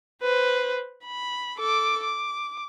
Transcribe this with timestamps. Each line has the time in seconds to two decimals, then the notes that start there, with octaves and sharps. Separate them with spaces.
0.23 B4 C5
1.05 B5
1.58 A4 D6
2.04 D6